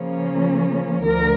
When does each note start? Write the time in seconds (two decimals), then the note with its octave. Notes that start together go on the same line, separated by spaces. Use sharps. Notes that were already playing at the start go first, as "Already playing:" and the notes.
Already playing: C#3 F3 A#3 C#4
1.03 D2 D3 F3 A#4